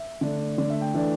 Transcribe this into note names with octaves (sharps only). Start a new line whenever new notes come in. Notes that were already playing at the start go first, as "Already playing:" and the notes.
Already playing: E5
D3 A3 D4
D3 A3 D4 D5
E5
G5
E3 A3 D4